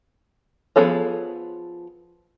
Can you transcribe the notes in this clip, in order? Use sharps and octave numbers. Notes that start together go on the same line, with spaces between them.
F3 B3 G#4 A4 C#5